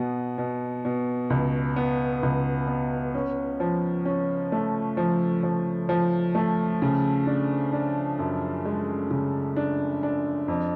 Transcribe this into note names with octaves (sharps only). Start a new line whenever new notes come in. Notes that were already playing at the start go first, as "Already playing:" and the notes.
Already playing: B2 B3
B2
B2
C#2
B3
C#2
B3
C#4
F3
C#4
A3
F3
F3
F3
A3
C#3
D4
D4
F#2
G#3
C#3
D4
D4
F2